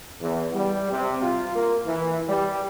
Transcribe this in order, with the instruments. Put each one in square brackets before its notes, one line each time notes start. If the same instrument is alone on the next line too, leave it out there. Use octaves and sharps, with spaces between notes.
[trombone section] E2
G3
C3
F4
A#3
E3
G3